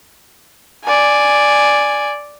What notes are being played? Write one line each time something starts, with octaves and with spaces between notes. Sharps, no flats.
D5 G#5